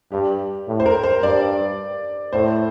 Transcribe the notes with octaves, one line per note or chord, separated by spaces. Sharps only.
G2 G4
A2
C5
A#4
C5
G2 D5
A2 C5